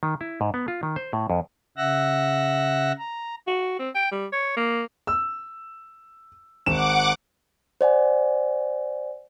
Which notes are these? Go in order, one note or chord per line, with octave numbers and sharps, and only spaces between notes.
D#3
E4
G#2
B3
F4
D#3
C5
A2
F2
C#3 E5 F#5 E6 F#6 A#6
A#5
F#4
C4
G5
G3
C#5
A#3
E6
G#1 F#5 D6 E7
C5 D5 F#5 G#5